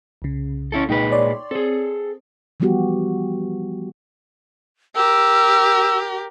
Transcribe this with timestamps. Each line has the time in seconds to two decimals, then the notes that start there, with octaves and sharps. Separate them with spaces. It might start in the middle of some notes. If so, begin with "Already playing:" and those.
0.22 C2 C#3
0.72 C#4 E4 A4
0.89 A#2 G#3 D#4 B4 G5
1.11 C#5 D5 C6
1.51 C4 G#4 A4
2.60 E3 F3 G3 B3 F#4 G4
4.96 G4 A#4 E6